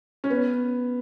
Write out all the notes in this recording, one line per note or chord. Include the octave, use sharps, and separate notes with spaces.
C#4
B3